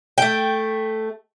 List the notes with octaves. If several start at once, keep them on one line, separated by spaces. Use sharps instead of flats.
A3 G5